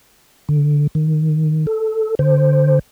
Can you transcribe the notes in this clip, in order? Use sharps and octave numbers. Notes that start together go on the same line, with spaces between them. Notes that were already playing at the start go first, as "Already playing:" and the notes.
D3
D#3
A4
D3 C5